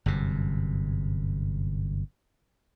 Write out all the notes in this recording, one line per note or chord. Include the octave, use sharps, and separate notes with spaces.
G1 F#2 C3